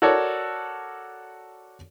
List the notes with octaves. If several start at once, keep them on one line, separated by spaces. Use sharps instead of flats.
F#4 A4 A#4 C#5 D5